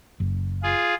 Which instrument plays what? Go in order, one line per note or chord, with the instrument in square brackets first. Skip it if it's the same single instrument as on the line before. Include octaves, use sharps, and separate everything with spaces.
[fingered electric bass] F#1
[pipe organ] F4 G#4